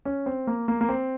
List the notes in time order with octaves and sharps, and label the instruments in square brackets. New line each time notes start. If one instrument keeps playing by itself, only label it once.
[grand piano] C#4
C4
A#3
A#3
A#3
C4